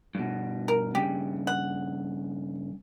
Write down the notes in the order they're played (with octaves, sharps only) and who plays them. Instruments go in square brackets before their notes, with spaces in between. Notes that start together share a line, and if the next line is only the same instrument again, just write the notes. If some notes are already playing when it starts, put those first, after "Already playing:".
[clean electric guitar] G2 B2
[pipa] A#4
[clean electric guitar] G2 C#3 [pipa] G4
[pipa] F#5